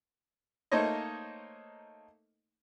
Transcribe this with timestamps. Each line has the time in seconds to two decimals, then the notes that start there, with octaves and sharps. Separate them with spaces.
0.72 A3 A#3 D#4 C5 C#5 D#5